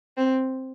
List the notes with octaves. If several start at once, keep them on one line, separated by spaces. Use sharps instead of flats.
C4